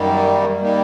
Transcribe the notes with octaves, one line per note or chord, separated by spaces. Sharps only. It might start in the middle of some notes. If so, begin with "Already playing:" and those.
Already playing: F#2 D#3 G3 A#3
D#3 G3 A#3